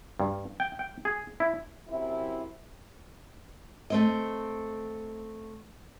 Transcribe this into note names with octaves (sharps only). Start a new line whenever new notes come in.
G2
G5
G5
G#4
E4
F#2 C3 E4
A3 C4 D#5